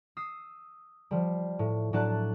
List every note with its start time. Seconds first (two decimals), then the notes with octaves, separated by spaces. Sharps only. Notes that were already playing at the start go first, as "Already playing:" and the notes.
0.17 D#6 E6 C7
1.11 F3 G3
1.59 A2
1.93 A2 F#3 D4 A5 F#6